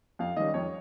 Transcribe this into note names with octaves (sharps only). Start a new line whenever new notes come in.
F2 F5
D#3 G3 C#4 D#5
F2 C#5